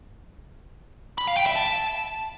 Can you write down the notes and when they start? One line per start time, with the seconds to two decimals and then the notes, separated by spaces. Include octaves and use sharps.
1.18 B5
1.27 F5
1.37 G5
1.46 E5
1.56 A5